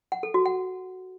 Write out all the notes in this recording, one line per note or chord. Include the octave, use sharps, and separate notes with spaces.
F#5
A4
F#4
F#5